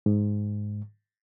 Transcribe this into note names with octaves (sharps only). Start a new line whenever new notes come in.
G#2